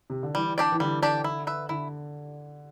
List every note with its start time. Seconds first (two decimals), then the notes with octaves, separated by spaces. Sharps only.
0.10 C3
0.23 D3
0.35 E3 G3
0.58 D4 G4 D5
0.72 E3
0.80 D3 G3
1.03 D4 G4 D5
1.24 E4
1.47 B4 E5
1.69 D3 E4